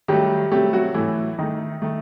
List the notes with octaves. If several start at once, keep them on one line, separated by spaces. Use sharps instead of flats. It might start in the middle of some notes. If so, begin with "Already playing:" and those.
D#3 F#3 G3 A3 G4
C3 F#3 G3 A3 G4
F#3 F#4
A2 E3 F#3 A3 E4
D#3 A3 D#4
D#3 A3